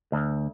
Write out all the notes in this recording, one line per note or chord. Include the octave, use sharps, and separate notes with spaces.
D2